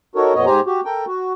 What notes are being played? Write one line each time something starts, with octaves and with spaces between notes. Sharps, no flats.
D#4 F#4 A4 A#4 C#5
F2 A#2 B3 C#5 D#5
G#2 G4 C5 G#5 A#5
F#4 G4
A4 A#4 G5
F#4